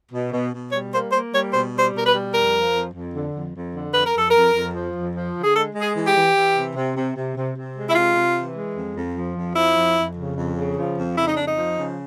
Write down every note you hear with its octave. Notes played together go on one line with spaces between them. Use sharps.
B2
B2
B2
G3 C#5
A#3 C5
A#3 C5
G3 C#5
B2 C5
G3
C5
B2 A#4
B4
G3
F2 A#4
F3
F2
F2
D3
F2
F2
D3
F2 B4
A#4
F2 A4
F2 A#4
F2
F3
F2
F3
D3
G#4
G#3 A4
G#3
G#4
E3
G4
E3
E3
C3
C3
C3
C3
C3
C3
G#3
E4
C3 F4
C3
E3
G#3
F2
F2
F3
F2
F3 E4
F2
F2
C#3
F2
C#3
F3
F2
C#3 E4
D#4
F2 D4
D#4
F3
C#3